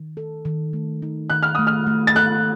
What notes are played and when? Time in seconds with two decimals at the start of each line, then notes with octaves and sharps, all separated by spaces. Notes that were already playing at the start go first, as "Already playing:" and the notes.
Already playing: D#3
0.17 A4
0.45 D#3
0.73 A3
1.02 D#4
1.30 D#3 F#6
1.43 F6
1.55 A3 D#6
1.67 F6
1.87 A3
2.07 A6
2.15 A4 F#6